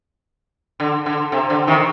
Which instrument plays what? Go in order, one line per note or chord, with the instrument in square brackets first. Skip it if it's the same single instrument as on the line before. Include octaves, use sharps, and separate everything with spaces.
[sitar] D3
D3
C3
D3
C3 D#3